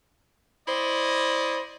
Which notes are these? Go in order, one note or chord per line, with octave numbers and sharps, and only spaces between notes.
E4 C5 D5 D#5